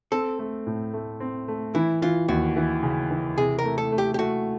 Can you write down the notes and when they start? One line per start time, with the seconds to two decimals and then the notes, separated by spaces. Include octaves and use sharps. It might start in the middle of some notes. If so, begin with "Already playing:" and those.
0.12 C4 A4
0.39 A3
0.67 A2
0.93 A3
1.20 C4
1.48 A3
1.75 E3 E4
2.02 E3 F4
2.28 D#2 F#4
2.57 E3
2.83 C#3
3.10 E3
3.38 C3 G#4
3.59 A#4
3.65 A3
3.78 A4
3.92 A3
3.98 G4
4.14 G4
4.18 A3 F#4